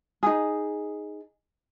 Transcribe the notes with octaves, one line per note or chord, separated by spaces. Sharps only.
D#4 G#4